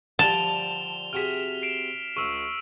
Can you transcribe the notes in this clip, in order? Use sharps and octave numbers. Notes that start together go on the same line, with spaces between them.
D3 F3 G3 A5 E7 F7 G7
C3 F#4 G#4 F6 B6
C7 D7 E7
C#2 C#6 E6